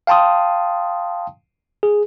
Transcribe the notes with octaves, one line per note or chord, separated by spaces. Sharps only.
F5 G5 A5 C6 D#6
G#4